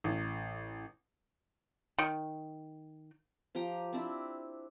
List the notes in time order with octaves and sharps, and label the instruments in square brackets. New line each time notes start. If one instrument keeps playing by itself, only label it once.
[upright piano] A1
[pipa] D#3
[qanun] F3 G4 G5 A#5
C4 D4 E4